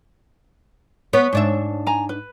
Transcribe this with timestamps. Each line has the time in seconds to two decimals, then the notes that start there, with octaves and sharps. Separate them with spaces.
1.13 B3 C#5
1.33 G#2 D4 E5
1.86 G#5 A#5
2.09 B4